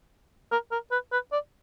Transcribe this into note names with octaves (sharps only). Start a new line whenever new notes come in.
A#4
A#4
B4
B4
D5